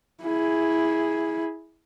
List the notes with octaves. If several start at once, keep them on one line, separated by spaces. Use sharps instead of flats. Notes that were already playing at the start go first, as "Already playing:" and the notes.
E4 G#4